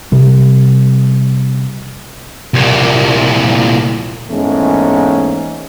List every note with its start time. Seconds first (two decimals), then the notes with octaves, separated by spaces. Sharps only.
0.12 C3 G3
2.54 C2 A#2
4.29 E2 G#2 A3 A#3 C#4